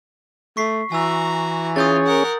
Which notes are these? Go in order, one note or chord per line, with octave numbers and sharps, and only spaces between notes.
A3 C#6 B6 C7
E3 F#4 G#5 A#5 E6
C#4 F4 G#4 C#5 D#6 G6 A6
A#4 F#5